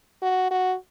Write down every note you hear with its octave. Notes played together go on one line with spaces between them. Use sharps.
F#4
F#4